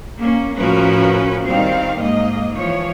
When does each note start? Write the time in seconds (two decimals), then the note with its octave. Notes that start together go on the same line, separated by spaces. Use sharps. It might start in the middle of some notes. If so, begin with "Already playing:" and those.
0.19 A#3 C#4
0.58 A2 F3 C#4 F#4 A#4 B4
1.45 D#3 G3 C4 F5
2.00 G#2 A#3 D#5
2.58 E3 F3 C#5